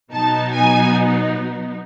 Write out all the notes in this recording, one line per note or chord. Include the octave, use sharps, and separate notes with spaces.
B2 F#3 B3 D#4 A5
G#5